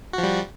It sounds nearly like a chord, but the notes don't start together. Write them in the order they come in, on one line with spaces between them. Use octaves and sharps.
F#4 F3 G3